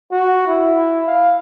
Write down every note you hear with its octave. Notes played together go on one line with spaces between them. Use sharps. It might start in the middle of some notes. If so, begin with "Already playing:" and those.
F#4
E4
F5